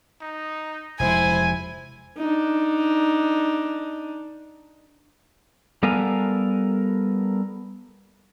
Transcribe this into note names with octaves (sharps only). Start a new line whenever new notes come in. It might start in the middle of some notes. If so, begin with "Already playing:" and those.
D#4
F1 G#3 E4 C5 G#5
D4 D#4
G3 B3 A4 A#4 F5 G#5